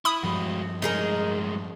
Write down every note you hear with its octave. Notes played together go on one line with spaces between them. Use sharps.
E4 B5 D#6
G2 F3 G3 G#3 F#4
A2 G#3 D#4 G#4 A#4